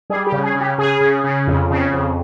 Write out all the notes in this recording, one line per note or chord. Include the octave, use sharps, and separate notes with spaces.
G3 G#4
G4
C#3
G#4
C#3
G4
C#3 G#4
C#3
C#3
F2
C#3
F2